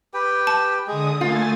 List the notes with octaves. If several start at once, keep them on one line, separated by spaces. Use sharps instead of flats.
G4 B4 G5
A5
D3 G#3 G#4 D#6
A3 A#3 F4 G#5 A6